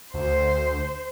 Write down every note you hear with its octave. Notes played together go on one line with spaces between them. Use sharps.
D2 C5